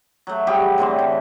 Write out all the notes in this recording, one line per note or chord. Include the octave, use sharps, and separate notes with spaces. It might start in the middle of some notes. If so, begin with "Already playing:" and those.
F#3 A3
F#3 G3 G4 G#4
A2 D3 E3 C4
A2